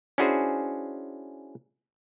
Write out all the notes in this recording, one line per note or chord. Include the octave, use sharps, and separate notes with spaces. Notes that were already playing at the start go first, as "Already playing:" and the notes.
C#4 D4 E4 F#4 G#4 C5